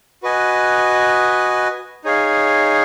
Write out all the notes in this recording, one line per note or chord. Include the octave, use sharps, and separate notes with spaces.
F#4 B4 D#5 G#5
D#4 G#4 C#5 F5